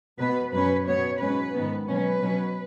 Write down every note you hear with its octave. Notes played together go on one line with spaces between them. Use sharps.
B2 B3 B4
F#2 F#3 C#4 B4
B2 B3 C#5
G#2 F#3 C#4 B4
G#2 D#3 B3
B2 F#3 C#4 B4
B2 F#3 C#4